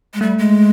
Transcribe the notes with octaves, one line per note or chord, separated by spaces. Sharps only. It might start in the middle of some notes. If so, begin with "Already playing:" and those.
G#3
G3 A3
G#3